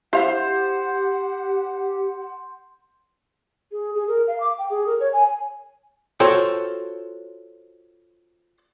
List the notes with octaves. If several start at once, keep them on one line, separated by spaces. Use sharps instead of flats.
E4 G4 C5 F5 F#5
G#4
G#4
A#4
F5
D6
G5
G#4
A#4
C#5
G#5
F4 F#4 A4 C5 C#5 G5